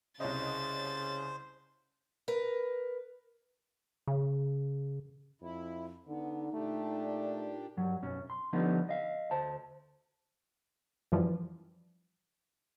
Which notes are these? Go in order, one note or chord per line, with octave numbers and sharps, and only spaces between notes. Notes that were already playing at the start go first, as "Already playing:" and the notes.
C2 C#3 C5 C#5 D#5 A6
A#4 B4
C#3
F2 E4
D3 B3 D#4
A#2 A3 D4 G4
G2 F#3
B1 F#2 C#4
C6
D3 F3 G3 B3 C#4 D#4
D#5 F5
D2 C5 A5
F#2 E3 F3 G3